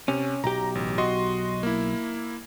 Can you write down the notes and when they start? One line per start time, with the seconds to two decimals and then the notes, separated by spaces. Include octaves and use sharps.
0.08 C3 C#4
0.44 B1 G4 A#5
0.75 A1
0.98 F#4 D#5 C6
1.63 A#3 E4